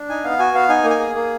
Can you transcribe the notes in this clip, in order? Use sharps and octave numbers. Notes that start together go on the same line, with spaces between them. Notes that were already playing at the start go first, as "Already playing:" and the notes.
Already playing: D4
D#4 G#5
B3 F5
F#4 G#5
B3 F5
D#4 G#5
A#3
G#5
G#4
A#3